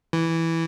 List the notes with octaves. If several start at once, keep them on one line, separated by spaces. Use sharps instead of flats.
E3